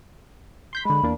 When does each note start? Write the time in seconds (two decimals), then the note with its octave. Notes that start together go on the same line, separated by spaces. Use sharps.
0.73 C6 G6 B6
0.85 D3 G#3 B5
1.03 E2 A#3 D4